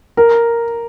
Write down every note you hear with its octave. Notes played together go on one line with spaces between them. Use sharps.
A#4